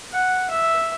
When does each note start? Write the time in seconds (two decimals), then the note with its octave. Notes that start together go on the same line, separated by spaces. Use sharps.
0.12 F#5
0.50 E5